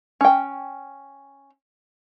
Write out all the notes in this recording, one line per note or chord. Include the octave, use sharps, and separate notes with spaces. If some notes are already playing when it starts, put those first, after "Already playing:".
C#4 G5